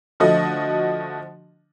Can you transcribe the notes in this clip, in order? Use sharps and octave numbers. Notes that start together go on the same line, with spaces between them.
D3 F3 A3 F#4 D#5